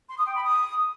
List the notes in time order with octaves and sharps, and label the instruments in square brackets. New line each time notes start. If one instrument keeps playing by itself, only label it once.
[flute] C6
D#6
G5
B5
D#6